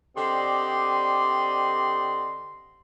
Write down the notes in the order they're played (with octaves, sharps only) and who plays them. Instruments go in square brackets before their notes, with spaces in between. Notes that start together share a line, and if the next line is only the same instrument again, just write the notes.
[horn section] D3 C4 G4 D5 D#5 C6